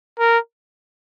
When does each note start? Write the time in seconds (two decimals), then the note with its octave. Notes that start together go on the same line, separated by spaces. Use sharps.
0.19 A#4